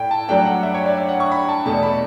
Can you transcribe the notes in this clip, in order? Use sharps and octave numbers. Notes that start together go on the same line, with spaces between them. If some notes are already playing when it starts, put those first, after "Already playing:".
Already playing: A2 D5 G5
A5
G2 F#3 A3 D4 G5
F#5
E5
C#5
D5
E5
F#5
C#6
B5
A5
E2 B2 A3 A5
B5